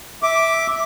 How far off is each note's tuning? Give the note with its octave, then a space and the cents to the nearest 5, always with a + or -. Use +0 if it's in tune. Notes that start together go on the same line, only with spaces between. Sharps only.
E5 -10 D6 +0